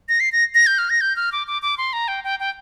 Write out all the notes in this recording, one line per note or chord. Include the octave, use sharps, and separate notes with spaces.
A#6
C7
A#6
A#6
G6
F6
A#6
G6
F6
D6
D6
D6
C6
A#5
G5
G5
G5